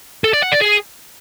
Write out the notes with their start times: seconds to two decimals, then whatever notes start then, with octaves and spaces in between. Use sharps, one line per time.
0.24 A4
0.33 D5
0.42 F#5
0.52 D5
0.61 G#4